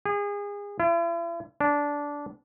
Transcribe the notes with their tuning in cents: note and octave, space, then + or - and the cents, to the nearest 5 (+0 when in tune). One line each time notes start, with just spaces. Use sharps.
G#4 -30
E4 +45
D4 -15